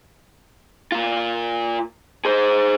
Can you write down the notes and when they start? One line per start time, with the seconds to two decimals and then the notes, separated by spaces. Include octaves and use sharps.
0.92 A#2 F4
2.25 G#4 C5